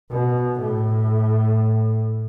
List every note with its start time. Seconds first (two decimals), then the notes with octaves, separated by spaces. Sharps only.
0.11 B2
0.60 A2